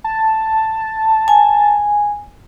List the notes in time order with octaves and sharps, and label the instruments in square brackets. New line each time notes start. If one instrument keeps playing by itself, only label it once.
[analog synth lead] A5
[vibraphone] G#5